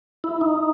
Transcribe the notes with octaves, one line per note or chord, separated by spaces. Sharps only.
E4
D#4